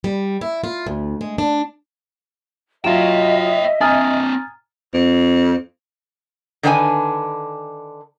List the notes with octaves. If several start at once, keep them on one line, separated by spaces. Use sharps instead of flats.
G3
E4
F4
D2
G#3
D4
F#3 F4 C#5 D#5 E5 G5 E7
C4 D4 G#5 A#5 D#6 F6 A6
F2
D3 D#3 D4 B4 F5 G#5